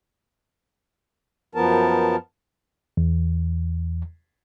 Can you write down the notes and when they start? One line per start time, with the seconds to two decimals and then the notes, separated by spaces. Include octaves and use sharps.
1.55 F#2 F3 B3 A#4 A5
2.97 E2